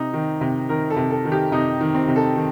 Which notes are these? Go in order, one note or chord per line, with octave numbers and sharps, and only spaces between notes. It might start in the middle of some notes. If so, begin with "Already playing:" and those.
Already playing: C3 D#4
D#3
C3
D#3 A#4
A4
C3
A4
D#3
G4
C3 D#4
D#3
C4
C3
A4
D#3